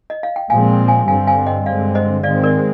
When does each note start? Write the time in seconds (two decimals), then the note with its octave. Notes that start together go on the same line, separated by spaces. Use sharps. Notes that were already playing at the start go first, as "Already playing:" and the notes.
0.10 D#5
0.23 F5
0.36 G5
0.50 A#2 F3 G#3 C4 F5 G#5
0.88 F5 G#5
1.08 G2 D3 G3 C4 F5 G#5
1.27 F5 G#5
1.46 D#5 G5
1.66 G2 D3 G#3 C4 D5 F5
1.95 C5 D#5
2.24 G#2 D#3 G#3 C4 D5 F5
2.43 A#4 D5